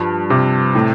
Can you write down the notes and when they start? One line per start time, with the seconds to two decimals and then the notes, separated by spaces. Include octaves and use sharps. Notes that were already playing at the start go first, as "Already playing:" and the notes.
Already playing: G2 F3
0.30 C3
0.75 A2